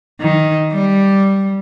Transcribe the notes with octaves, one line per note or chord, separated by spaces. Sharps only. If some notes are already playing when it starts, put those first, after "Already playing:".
D#3
G3